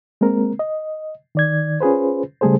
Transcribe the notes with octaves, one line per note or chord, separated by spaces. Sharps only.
G#3 A#3 C4 A#4
D#5
D#3 D5 G#6
C#4 F4 G#4 B4 C5
C#3 G3 A3 G#4 A4 C5